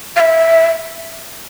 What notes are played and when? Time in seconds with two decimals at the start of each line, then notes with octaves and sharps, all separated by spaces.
0.16 F5
0.20 E5